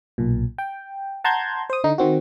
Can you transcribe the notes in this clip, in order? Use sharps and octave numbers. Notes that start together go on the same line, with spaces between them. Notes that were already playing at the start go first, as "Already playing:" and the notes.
B1 A#2
G5
F#5 A5 A#5 C6 G6 G#6
C5 D#6
D3 D#4
D#3 C4 F#4